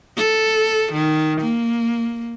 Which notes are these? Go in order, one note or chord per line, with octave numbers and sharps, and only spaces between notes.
A4
D#3
A#3